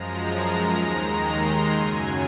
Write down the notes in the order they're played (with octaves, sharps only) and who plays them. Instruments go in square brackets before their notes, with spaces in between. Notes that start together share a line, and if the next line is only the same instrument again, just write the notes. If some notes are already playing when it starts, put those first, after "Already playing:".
Already playing: [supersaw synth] F#2 F3 G#3 A#5
A#5
D#2 D#3 G#3 A#5
C6
F#2 C#3 F#3 G#5